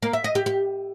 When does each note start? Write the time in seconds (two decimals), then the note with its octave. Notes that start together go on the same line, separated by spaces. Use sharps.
0.02 A#3
0.13 E5
0.24 D#5
0.35 G4
0.46 G4